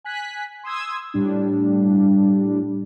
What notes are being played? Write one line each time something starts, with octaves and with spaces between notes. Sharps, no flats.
G#5 F#6 B6
C6 D#6 E6 G#6
A2 G3 D4